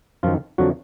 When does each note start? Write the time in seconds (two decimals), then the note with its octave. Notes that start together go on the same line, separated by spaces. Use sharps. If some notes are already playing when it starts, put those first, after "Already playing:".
0.23 F#2 D#3 F3 F4
0.58 F2 D3 F3 F#3 F#4